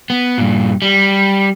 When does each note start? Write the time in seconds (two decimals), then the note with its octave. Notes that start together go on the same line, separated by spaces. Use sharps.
0.10 B3
0.38 G2 A#2
0.82 G3